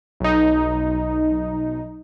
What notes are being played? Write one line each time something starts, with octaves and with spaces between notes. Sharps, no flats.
B1 D#4